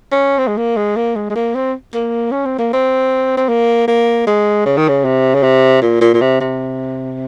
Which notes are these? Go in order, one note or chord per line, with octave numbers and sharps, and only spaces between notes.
C#4
C4
G#3
A#3
G#3
A#3
G#3
G#3
A#3
C4
A#3
C#4
C4
A#3
C4
C4
A#3
A#3
G#3
C#3
D#3
C#3
C3
C#3
C3
A#2
A#2
A#2
C3
C3